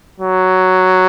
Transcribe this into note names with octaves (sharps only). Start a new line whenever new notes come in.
F#3